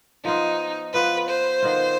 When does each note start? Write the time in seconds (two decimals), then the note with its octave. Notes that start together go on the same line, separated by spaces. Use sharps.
0.25 F3 B3 D#4 F4
0.93 F3 B3 F4 B4
1.29 C5
1.62 D#3 B3 F4